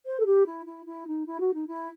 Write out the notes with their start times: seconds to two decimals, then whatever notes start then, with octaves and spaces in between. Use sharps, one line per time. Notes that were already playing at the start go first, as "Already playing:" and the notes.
0.06 C5
0.20 A4
0.26 G4
0.46 E4
0.66 E4
0.86 E4
1.07 D#4
1.26 E4
1.40 F#4
1.54 D#4
1.67 E4